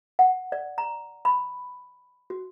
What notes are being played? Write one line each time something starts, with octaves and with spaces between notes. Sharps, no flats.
F#5
D5
A#5
B5
F#4